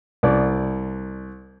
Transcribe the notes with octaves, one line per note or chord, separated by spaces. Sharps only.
C2 D5